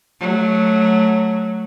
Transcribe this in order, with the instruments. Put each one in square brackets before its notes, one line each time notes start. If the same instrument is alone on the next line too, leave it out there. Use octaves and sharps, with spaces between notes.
[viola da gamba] F#3 A3